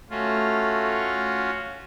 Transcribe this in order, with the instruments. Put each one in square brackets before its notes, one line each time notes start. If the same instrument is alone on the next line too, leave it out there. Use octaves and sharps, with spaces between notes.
[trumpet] A3 [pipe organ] C#4 F4 F#4